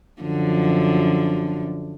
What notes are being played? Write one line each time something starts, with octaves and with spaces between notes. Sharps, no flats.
F#2 D3 F3